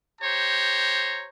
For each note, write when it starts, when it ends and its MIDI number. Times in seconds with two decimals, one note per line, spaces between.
0.21 1.26 67
0.21 1.26 72
0.21 1.26 73
0.21 1.26 82